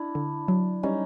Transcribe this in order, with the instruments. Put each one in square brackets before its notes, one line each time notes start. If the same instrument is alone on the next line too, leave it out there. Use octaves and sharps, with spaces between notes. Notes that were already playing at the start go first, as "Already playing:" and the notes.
Already playing: [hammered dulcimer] D4 E4
[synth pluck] D3
F#3
[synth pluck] G3 [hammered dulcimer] C#4 D#4